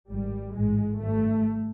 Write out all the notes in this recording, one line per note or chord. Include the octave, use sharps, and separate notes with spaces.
G#1 G#2 G3
A1 G#2 G#3
G#1 G2 A3